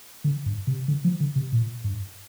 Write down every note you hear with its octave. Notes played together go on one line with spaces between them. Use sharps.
D3
G2
C3
D3
F3
D3
C3
A#2
G2